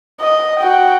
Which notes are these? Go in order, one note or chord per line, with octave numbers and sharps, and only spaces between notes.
D#5
F#4 G5